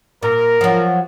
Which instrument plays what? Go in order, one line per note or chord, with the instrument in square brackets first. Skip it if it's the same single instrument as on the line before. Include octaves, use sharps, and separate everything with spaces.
[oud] A#2 [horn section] A#4
[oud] F3 F#3